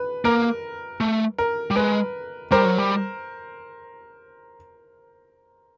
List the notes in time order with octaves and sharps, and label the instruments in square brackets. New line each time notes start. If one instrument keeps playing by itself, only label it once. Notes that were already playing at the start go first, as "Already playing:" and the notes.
Already playing: [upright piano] B4
[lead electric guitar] A#3 [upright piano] A#4
[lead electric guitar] A3
[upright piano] A#4
[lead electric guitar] G3
[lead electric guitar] G#3 [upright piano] B4
[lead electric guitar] G3 [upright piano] A#4 C5
[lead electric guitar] F#3
G3